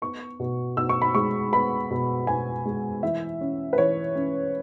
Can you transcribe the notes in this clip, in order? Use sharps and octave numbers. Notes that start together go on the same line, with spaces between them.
B3 C#6
B2
B2 E6
C#6
B5
G#3 C#6
B3 B5
B2
B2 G#5
G#3
E3 E5
C#4
B4
E3 C#5
C#4